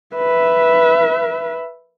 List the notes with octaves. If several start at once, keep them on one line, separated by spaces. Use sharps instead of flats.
B4 E5